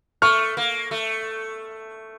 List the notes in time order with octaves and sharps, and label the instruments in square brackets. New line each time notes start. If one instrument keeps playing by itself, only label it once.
[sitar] A3 [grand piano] C#6 F6
[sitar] A#3
A3